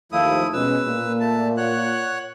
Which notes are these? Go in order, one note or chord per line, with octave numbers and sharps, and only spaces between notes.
D#2 F3 A3 E4 F5 D#6
B2 G#3 C#4 B4 E6
A#2
A3 A5
C#5 F#5 F#6